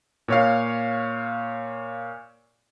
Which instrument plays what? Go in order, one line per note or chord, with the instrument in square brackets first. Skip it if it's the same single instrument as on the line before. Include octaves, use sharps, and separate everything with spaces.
[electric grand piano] A#2 C#5 F5